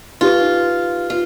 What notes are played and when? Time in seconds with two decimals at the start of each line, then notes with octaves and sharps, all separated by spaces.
0.21 D#4 F4 G4 B4
1.10 F4